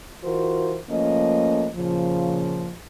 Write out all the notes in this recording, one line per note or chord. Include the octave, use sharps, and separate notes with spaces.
E3 F4 F#4 A#4 C5
F3 A3 A#3 C#4 D#5
A#2 C#3 F3